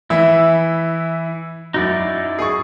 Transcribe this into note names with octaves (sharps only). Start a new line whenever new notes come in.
E3 E4 E5
F#2 D#4 E4 F#4 D5
G#4 G#5 C#6